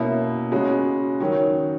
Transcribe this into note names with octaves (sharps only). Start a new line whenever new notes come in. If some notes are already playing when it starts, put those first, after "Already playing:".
Already playing: B2 A#3 C#4 E4
C#3 G#3 C#4 F#4
D#3 F#3 C#4